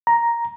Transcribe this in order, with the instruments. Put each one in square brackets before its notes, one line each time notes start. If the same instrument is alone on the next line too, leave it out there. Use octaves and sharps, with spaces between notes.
[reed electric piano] A#5